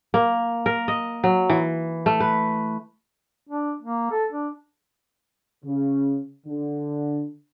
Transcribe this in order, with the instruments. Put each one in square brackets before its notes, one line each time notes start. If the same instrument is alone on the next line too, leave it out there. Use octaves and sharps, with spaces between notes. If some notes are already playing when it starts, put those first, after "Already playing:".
[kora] A#3
A#4
D#5
F#3
E3
A3
B4
[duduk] D4
A#3
A4
D4
[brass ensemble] C#3
D3